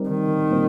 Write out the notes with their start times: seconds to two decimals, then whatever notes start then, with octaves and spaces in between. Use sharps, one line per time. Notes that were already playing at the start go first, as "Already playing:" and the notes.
Already playing: G3 C4 D#4 A#4 D5
0.09 D#3
0.50 A#2 G3 C4